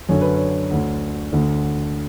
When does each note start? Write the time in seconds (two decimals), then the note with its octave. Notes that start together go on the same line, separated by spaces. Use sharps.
0.09 F#2 D3 C#5
0.21 B4
0.35 C#5
0.71 D2 D3
1.33 D2 D3